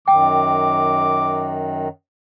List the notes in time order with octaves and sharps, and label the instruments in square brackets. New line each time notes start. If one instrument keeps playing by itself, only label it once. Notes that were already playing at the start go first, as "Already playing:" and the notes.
[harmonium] F#2 D#3 [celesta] G5 [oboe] D6